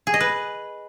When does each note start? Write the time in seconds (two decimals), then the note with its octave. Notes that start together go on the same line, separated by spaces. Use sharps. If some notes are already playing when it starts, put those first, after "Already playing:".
0.07 G#4
0.14 D#5
0.21 B4